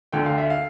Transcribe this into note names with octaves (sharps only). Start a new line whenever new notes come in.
D2 D3 A3 G5
F5
E5
F5